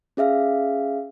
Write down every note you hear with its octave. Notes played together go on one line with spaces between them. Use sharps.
C#4 G#4 E5 F5